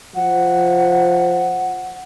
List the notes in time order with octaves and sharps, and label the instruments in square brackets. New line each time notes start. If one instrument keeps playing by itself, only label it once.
[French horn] F3 [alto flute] F#5